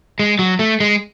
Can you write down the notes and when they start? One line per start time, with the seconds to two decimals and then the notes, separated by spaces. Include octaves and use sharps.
0.19 G#3
0.39 F#3
0.59 A3
0.80 G#3